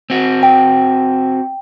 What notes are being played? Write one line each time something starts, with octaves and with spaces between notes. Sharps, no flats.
C4 F#4
G5